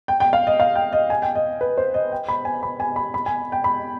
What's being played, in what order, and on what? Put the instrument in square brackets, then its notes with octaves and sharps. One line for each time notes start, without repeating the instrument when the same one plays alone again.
[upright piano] G5
G5
F5
D#5
F5
G5
D#5
G#5
G5
D#5
B4
C5
D#5
G5
B5
G#5
B5
G#5
B5
B5
G#5
G5
B5